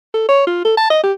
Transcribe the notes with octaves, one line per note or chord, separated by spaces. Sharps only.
A4
C#5
F4
A4
A5
D#5
G4